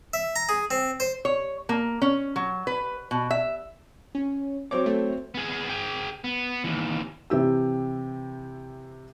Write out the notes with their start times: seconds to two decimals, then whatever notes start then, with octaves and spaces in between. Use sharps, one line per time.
0.14 E5
0.36 A#5
0.49 G#4
0.71 C4
1.00 C5
1.25 C#5
1.69 A#3
2.02 C#4
2.36 F#3
2.67 B4
3.11 B2
3.31 E5
4.15 C#4
4.71 F#3 C4 C#5 D6
4.86 A3
5.34 B3 G#4
5.69 G#4 G5
6.24 B3
6.64 D#2 E3
7.30 C3 E3 G4 E6